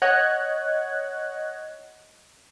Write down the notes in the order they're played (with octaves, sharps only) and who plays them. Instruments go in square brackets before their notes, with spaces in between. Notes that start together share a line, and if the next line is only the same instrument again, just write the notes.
[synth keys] C#5 D#5 F#5 F#6 G#6